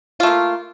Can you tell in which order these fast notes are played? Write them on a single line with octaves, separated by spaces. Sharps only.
F4 A3 A#3